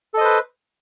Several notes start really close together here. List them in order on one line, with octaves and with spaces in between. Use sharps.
A4 D#5 C5 B4